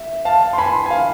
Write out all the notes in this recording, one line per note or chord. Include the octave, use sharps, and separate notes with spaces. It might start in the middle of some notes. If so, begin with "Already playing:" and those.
Already playing: E5
F5 A5
C6
G#5 B5
G#5
F5